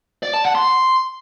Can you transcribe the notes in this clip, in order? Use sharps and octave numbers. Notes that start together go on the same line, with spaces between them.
D5
A5
F#5
C6